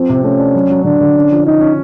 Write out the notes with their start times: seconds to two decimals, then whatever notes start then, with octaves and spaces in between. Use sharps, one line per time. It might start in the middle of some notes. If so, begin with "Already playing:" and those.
Already playing: F3 C4
0.09 C3
0.23 A3 C#4
0.39 D4
0.55 F#3
0.70 F#3
0.84 D3 D4
1.01 D3
1.16 C#4
1.31 F3
1.46 C#4 D#4
1.61 C#4